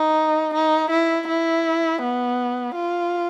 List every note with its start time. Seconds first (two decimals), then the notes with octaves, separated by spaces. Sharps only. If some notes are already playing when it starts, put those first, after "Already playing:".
Already playing: D#4
0.54 D#4
0.91 E4
1.28 E4
2.02 B3
2.75 F4